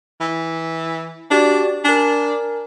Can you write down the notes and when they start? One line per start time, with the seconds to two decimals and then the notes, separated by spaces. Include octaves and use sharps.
0.21 E3
1.31 D4 F#4 G4 D5
1.85 D4 A#4 G#5